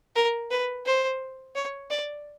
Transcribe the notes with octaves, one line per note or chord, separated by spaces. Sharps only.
A#4
B4
C5
C#5
D5